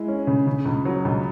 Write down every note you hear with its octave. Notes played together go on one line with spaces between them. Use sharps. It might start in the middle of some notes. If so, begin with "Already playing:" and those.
Already playing: G#3 E4
C#4
C#3
C#3
C#2
F#3
C#2